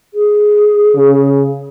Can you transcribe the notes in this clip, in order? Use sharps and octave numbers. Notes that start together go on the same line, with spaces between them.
G#4
C#3